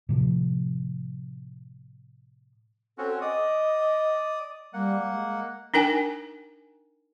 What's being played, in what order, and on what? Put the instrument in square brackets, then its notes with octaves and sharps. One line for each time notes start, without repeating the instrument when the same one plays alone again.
[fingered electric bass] A2 C3 F3
[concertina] C4 C#4 F#4 [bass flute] A4
[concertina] D5 D#6 [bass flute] D#5
[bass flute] G3 [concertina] A#3 F#5
[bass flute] G#3
[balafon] D4 D#4 A#4 G5 G#5